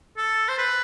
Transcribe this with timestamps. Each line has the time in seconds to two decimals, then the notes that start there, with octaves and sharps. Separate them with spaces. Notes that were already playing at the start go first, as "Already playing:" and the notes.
0.17 A4
0.49 C5
0.58 B4